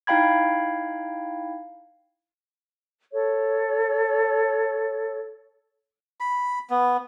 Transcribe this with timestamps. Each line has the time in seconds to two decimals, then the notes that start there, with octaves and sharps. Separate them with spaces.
0.07 D#4 E4 F5 G5 B5 G#6
3.12 A4 C#5
6.20 B5
6.70 B3